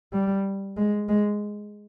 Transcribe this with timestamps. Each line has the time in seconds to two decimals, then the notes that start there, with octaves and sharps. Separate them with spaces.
0.13 G3
0.77 G#3
1.09 G#3